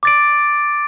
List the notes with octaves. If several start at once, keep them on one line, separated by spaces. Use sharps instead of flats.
D6 A6 D7